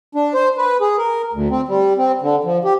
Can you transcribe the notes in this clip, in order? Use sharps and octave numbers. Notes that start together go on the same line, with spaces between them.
D4
C5
B4
G#4
A#4
D2
C4
G3
C4
D3
F3
G4